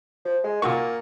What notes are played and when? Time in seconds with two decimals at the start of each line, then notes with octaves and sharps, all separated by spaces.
0.25 F3
0.44 G#3
0.62 A#2 A#3 F#4 C#6